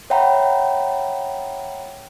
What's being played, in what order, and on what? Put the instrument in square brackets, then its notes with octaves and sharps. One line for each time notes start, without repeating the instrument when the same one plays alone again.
[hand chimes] C#5 E5 F#5 G5 A#5 B5